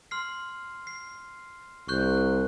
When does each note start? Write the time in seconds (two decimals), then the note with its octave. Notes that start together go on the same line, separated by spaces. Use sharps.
0.11 C6 F6 C7
0.87 C7
1.88 C2 C#6 F#6 G6